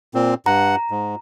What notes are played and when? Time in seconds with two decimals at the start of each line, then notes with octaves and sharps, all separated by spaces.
0.14 A#2 C4
0.46 G2 F#5 A#5
0.91 G#2